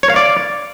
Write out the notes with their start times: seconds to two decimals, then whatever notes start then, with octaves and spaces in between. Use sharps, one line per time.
0.03 C#5
0.10 F5
0.16 D5